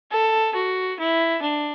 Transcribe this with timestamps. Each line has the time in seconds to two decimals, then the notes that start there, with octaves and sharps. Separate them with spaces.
0.12 A4
0.55 F#4
0.99 E4
1.42 D4